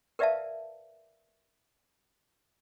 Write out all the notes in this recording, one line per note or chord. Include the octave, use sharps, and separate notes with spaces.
A#4 B4 D5 E5 F5 A5